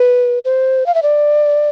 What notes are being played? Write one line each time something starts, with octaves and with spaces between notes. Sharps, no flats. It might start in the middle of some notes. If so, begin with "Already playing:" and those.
Already playing: B4
C5
F5
E5
D5